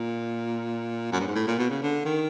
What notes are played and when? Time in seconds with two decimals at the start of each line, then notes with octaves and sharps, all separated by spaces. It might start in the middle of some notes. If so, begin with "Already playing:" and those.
Already playing: A#2
1.13 F#2
1.20 G2
1.27 G#2
1.35 A2
1.47 A#2
1.58 B2
1.70 C#3
1.82 D3
2.05 D#3